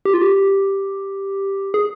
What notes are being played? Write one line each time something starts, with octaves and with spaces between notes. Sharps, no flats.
G4
F4
G4
G#4